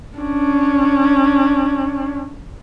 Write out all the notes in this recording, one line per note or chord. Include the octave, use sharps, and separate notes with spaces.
C#4 D4